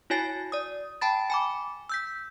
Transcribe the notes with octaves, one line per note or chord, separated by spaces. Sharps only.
E4 F#4 C#5 G#5 A6 C7
D5 D#6
G5 A5 B5 A6
G#5 B5 D6
E6 G6 B6